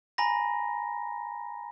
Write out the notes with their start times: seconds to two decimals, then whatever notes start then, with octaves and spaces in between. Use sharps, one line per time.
0.18 G#5 A#5 B5 A#6